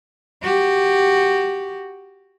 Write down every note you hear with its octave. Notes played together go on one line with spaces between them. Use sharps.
F#4 G4